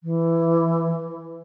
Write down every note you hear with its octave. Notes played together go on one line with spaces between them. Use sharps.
E3